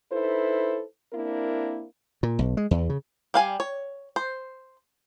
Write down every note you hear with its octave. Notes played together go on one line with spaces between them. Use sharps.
D#4 E4 A4 B4 C5
A#3 C4 D4 E4 A#4
A#2
B1
G#3
E2
C#3
G3 F5 G#5
C#5
C5